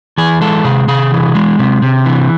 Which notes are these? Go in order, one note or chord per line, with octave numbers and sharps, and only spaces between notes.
E3 G#4
G#3 A4
C3 G#4
C3 G#4
E3
G#3
C3
C3
E3